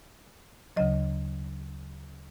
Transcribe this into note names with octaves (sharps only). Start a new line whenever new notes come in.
D2 C#3 F#3 D#5